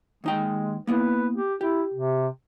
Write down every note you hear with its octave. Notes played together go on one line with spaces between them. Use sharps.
D#2 G#3 D#4 G5
A#3 B3 E4 B4
G4
E4 G4
C3